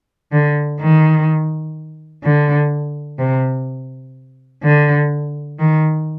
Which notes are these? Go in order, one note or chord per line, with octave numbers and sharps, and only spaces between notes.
D3
D#3
D3
C3
D3
D#3